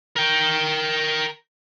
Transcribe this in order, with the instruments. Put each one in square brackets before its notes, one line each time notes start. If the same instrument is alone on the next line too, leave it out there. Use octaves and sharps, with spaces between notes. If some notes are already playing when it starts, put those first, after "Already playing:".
[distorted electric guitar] A#4 G5